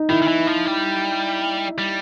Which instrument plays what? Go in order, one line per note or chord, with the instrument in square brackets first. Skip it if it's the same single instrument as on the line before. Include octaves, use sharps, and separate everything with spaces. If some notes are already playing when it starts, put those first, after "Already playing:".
Already playing: [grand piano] D#4
[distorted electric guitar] D#3 [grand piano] E4
[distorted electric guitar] D#3
E3
F3
G3
G3